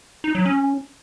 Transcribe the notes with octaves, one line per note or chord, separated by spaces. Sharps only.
D#4
F#3
C#4